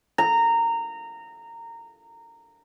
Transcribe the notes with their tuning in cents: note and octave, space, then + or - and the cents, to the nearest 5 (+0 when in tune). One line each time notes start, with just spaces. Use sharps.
A#5 -20